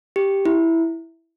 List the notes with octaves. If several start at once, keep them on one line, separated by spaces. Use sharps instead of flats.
G4
E4